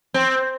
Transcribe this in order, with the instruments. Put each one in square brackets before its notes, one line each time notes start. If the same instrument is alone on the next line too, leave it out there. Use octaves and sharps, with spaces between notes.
[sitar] C4